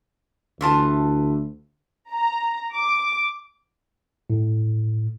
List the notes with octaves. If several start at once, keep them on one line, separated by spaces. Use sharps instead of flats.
D2 E3 F4 A5
A#5
D6
A2